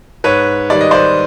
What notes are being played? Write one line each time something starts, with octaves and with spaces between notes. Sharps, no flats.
G#2 B4 C#5
D#3 G3 D5
D#5
C5 D5